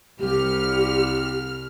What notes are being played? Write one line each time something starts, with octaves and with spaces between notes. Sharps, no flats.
C2 G4 F6